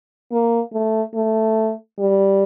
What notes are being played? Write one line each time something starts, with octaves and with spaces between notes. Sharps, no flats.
A#3
A3
A3
G3